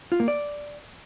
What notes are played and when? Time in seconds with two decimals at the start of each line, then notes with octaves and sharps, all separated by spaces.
0.12 F4
0.20 A#3
0.28 D5